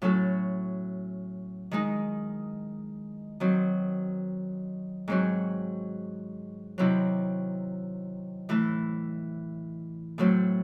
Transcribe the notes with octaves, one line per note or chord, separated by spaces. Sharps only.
A2 F#3 C#4 F#4 A4
D#3 G#3 D#4
D#3 F#3 C4
G#2 F#3 C4 F#4
C3 D#3 F#3 C4 E4
A2 E3 A3
A2 F#3 A3 C4